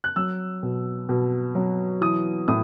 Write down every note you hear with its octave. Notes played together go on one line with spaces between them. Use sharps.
F#6
F#3 E6
B2
B2
F#3
E3 D#6
A2 D#6